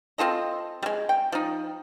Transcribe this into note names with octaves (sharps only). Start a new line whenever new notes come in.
C4 F4 A4 D#5
G3 G#3
G5
F3 D#4